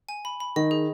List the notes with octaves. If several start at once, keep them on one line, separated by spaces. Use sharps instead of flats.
G#5
B5
B5
D#3 D#5
G#4